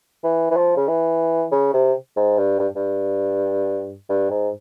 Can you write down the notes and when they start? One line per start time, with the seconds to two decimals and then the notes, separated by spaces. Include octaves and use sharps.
0.24 E3
0.51 E3
0.56 F3
0.77 C#3
0.88 E3
1.52 C#3
1.73 C3
2.16 G#2
2.38 G2
2.59 G2
2.76 G2
4.09 G2
4.30 G#2